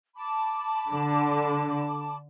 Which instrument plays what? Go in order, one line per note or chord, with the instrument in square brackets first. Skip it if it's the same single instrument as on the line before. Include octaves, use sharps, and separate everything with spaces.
[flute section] A5 B5 D6
[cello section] D3